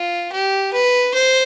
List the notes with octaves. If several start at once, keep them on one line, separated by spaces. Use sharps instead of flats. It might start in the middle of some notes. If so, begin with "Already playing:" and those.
Already playing: F4
G4
B4
C5